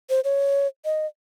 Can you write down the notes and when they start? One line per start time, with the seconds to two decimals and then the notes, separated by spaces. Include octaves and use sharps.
0.10 C5
0.24 C#5
0.85 D#5